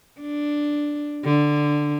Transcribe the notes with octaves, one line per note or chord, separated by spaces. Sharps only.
D4
D3